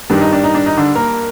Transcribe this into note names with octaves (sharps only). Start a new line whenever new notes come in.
G2 D#3 G3 D4
D#4
D4
D#4
D4
D#4
D3 D4
A#3 A#4